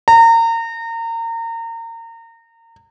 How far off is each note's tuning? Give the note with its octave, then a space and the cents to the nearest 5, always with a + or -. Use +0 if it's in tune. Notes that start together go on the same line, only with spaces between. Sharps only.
A#5 -30